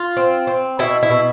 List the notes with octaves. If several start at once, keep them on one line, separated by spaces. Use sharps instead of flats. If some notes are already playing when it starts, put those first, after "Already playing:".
Already playing: F4
C4
C4
B2 E4
E4
B2